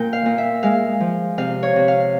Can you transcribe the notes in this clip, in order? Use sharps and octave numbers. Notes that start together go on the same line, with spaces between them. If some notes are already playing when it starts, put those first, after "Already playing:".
Already playing: A#2 G5
F5
A#2
E5
G#3 F5
F3
C3 F5
C#5
C3
F5